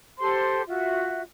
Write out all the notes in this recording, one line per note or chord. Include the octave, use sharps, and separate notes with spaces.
G4 A4 C5 C6
F4 F#4 E5